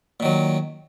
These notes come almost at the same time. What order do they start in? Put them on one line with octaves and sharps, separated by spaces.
A#2 D#3 F#3